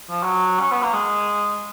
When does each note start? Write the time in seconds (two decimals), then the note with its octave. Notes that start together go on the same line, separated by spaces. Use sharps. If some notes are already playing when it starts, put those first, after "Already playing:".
0.10 F3
0.23 F#3
0.59 C#4
0.71 B3
0.82 A#3
0.93 G#3